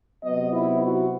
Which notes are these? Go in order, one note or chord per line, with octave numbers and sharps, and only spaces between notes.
C3 F#3 B3 D#5
E4
F#4